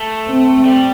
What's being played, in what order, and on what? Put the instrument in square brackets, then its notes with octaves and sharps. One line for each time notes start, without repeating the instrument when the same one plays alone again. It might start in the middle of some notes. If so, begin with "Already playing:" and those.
Already playing: [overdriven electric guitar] A3
[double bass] C4
[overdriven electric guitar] G3